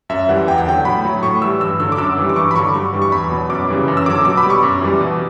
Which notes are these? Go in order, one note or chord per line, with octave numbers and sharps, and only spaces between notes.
F#2 E5
E3 G3 F#5
E2 G5
F#5
D3 F#3 G5
A2 B5
F#3
A2 C#6
E3 G3 E6
G2 E6
D3 F#3 E6
D6
F#2 E6
E3 G3
D6
G2 C#6
B5
D3 F#3 C#6
G2 C#6
E3 G3
C#6
E2 B5
B2 F#3
F#2 D6
C#3 E3 G3
F#2
E6
D3 F#3 D6
E6
B2 D6
B5
G3
C#6
F#2
E3 G3
B2